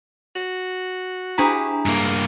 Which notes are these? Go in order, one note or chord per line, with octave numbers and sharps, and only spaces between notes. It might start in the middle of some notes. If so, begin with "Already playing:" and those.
F#4
D4 E4 G4 G#4 A#5
G2 G#3 A#3